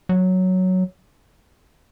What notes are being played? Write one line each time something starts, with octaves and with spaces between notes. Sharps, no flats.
F#3